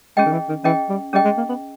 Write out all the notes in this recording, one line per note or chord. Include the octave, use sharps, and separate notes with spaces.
G#3 C#4 G#4 D#5 G5
D#3
E3
D#3
E3 C#4 G#4 D#5 G5
G3
G3 C#4 G#4 D#5 G5
G#3
A#3
B3